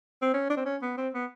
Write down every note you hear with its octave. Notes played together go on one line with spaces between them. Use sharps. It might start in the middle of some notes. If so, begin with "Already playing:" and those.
C4
C#4
D4
C4
C#4
B3
C4
B3